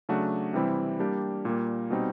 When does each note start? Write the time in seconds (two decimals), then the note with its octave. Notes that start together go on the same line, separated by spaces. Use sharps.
0.09 C#3 F#3 A3 D4 F#4
0.53 C3 E3 G3 C4 E4
0.99 G3 A#3 D4 G4
1.45 A#2 G3 A#3
1.90 B2 G3 C4 D#4